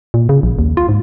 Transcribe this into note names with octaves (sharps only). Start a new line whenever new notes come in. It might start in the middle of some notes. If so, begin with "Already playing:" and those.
A#2
C#3
A#1
D#2
F4
G#2